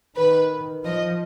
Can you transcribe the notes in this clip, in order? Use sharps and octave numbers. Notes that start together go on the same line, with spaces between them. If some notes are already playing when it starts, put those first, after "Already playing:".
D#3 B4
F3 D#5